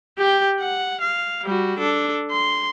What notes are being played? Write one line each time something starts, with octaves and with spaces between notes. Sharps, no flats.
G4 G5
F#5
F5
G3 F#4
D4 A4
C6